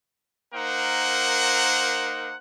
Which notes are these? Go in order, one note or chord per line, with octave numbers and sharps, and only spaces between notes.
A#3 D#4 A#4 C5 F#5